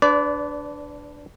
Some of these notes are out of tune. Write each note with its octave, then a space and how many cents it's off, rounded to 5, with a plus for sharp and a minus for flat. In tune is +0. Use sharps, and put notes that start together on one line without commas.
D4 +0 B4 +25 D5 -25